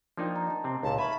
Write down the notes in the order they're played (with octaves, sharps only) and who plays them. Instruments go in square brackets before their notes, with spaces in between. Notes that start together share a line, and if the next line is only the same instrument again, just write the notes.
[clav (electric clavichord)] F3 A#3 D#4 [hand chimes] D4 D5 G5
[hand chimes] D#5 A#5
D#5 A5
[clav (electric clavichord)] C3 C4
[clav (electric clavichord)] C#2 A#2 [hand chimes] D#4 [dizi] A5
[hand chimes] E5 F5 C#6 [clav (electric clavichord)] G#5 A5 [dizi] B5